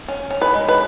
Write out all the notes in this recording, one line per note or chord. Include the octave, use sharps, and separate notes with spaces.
C#4
C#4
B4
G#3
B4